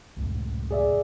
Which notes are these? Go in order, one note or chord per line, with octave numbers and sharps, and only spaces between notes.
C#2 F#2 A2
G#4 D5 E5